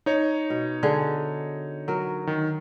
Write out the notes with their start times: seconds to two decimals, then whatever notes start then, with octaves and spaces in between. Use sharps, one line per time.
0.06 D#4 C#5
0.50 B2
0.83 D3 G#4
1.88 F#3 A#4
2.27 D#3